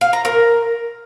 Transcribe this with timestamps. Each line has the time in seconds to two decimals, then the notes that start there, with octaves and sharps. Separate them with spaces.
0.01 F5
0.13 A#5
0.25 A#4